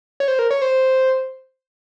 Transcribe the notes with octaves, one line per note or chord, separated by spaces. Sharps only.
C#5
C5
A#4
C#5
C5